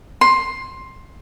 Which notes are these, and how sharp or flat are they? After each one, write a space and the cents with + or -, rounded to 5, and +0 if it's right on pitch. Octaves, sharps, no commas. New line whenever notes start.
C6 +15